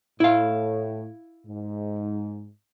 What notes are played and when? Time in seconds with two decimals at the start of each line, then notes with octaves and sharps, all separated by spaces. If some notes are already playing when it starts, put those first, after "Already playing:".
0.20 A2 E4 F5
1.47 G#2